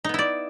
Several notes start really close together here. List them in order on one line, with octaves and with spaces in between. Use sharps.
D#4 B3 E4 D5